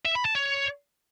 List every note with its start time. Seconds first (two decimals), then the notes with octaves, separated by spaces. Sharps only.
0.05 E5
0.15 B5
0.25 A5
0.35 C#5